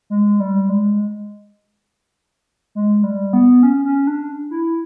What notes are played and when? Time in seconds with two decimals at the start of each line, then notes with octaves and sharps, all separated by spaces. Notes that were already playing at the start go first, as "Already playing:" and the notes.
0.10 G#3
0.40 G3
0.69 G#3
2.75 G#3
3.04 G3
3.33 B3
3.63 C#4
3.85 C#4
4.07 D4
4.51 E4